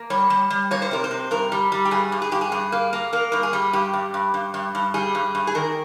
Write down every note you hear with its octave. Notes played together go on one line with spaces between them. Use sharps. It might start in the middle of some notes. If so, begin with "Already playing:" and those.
Already playing: A#3
G3 C#5
G3
G3
A#3 C#5
C5
C3 A#4
C5
C3
G2 A#4
G3
G3
G4
G2 G#4
G2
G#4
G2 G4
G#4
G2
A#3
A#3
A#3 A#4
G2 A#4
G#4
G3
G2 G4
G2
G2
G2
G2
G2
G3 G#4
G2
G2
G#4
D#3 A#4